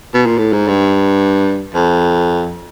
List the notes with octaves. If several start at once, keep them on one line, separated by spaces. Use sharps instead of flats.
B2
A#2
A2
G#2
G2
F2